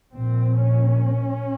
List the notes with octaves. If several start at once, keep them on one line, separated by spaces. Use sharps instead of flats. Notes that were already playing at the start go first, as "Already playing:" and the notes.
A#1 A#2 C4
C#4